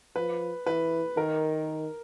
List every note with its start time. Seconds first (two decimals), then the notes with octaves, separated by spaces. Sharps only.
0.16 F3 B4
0.66 E3 B4
1.17 D#3 A#4